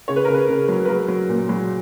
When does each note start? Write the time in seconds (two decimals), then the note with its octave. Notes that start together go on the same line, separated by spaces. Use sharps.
0.08 C#3 C#5
0.16 B4
0.25 A#4
0.28 C#3
0.34 B4
0.49 C#3
0.68 F#3
0.85 B4
0.88 F#3 A#4
1.08 F#3
1.29 A#2
1.49 F#3